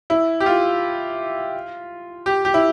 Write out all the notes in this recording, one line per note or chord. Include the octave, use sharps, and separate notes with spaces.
E4
G4
F4
G4
G4
E4